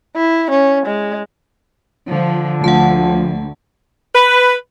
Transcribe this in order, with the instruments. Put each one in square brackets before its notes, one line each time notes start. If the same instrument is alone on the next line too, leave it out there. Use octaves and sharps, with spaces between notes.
[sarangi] E4
C#4
G#3
[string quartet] D3 [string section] F3
[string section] D2 [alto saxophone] F3 [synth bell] F#5 A5
[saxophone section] B4